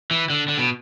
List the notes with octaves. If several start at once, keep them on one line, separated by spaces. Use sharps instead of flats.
E3
D3
D3
B2